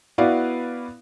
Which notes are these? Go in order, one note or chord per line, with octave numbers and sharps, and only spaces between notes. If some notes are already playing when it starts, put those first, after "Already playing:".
B3 E4 F#4 B4 D5 F5